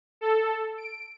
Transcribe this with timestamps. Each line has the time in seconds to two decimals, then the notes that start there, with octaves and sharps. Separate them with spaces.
0.21 A4
0.78 D7